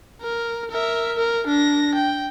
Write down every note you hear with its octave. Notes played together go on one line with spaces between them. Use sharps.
A#4
A#4 E5
A#4
D4 A#6
G5